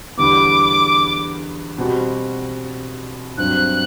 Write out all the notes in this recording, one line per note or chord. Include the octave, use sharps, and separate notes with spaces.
E2 D3 G3 B3 D6
B2 G3 C4 F#4
G2 F#3 C4 F#6